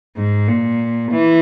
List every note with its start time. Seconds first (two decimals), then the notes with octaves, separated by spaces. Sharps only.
0.16 G#2
0.48 A#2
1.12 E3